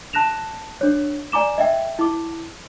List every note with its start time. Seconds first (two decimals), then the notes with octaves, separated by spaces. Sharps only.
0.13 A5 F#6 A#6 E7 F7
0.81 D4 C#5
1.32 D5 G#5 A#5 D6 E7
1.58 D#5 E5 G5
1.99 E4 D6